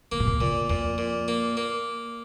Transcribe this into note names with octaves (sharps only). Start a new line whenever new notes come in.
C3 A#3
A#2
C3
A#2 C#3
F2 A#2
A#2
A#3
A#3